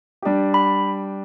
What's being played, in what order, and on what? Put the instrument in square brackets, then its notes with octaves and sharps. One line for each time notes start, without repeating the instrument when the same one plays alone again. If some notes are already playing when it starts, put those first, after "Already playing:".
[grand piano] G3 D4 G4
[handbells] B5